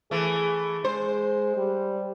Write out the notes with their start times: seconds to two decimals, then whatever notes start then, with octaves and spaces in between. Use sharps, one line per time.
0.11 E3 A3 G#4
0.84 G#3 C5
1.57 G3